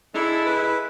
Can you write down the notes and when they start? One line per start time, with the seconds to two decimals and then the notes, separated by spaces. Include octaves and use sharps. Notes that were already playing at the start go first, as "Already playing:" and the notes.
0.14 G#3 D4 E4 A4
0.46 B4